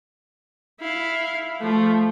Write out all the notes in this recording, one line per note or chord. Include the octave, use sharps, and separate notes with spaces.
E4 F5
F3 A3